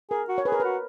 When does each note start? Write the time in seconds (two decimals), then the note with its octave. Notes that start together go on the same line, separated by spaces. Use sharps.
0.10 G#4 A#4
0.29 F#4
0.38 C#5
0.45 G#4 B4
0.52 A#4
0.60 F#4 B4